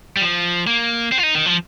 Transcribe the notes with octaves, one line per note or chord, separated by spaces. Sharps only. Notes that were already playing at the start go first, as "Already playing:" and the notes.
G3
F3
A#3
C4
F4
D#4
D#3
F3